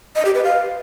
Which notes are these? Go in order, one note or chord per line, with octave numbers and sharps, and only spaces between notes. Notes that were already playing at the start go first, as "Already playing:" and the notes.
D#5
G4
B4
F5